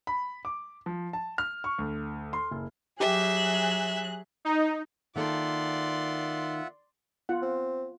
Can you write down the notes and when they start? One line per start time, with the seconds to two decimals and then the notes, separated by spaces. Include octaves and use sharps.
0.07 B5
0.45 D6
0.86 F3
1.13 A5
1.38 F6
1.64 C#6
1.79 D2
2.33 C6
2.51 F#1
3.00 F#3 G4 G#4 E5 F#6
4.45 D#4
5.16 D#3 A#3 F4 A4 D5 E5 F#5 C6
7.29 B3 F4 F#5
7.42 C4